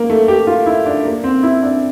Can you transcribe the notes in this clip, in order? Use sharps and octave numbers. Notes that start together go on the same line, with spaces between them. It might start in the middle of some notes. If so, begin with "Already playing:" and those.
Already playing: A#3
A3
G4
F4
E4
D4
A#3
C4
E4
D4